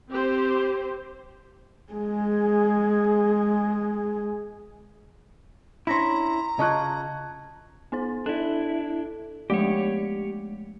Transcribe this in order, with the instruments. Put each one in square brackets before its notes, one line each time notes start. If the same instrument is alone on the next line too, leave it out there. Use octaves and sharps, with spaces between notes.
[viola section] C4 G4 C5
[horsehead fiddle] G#3 G#4
[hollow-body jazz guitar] C#4 D4 E4 [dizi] A#5 [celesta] C6 A#6 B6
[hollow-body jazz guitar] C#3 F4 [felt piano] D#5 C#6 F#6 [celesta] A5 G#6
[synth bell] B3 D#4 C5
[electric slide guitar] D4 E4 [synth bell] A4
[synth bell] F3 G#3 A3 [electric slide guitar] G4 C#5